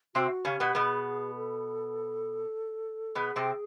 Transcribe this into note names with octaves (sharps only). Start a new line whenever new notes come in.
C3 C4 F#4
C#3 C#4 G4
B2 B3
B2 B3 G#4
A4
B2 B3 G#4
C3 C4